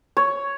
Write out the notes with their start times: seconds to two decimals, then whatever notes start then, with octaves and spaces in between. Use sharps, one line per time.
0.17 C#5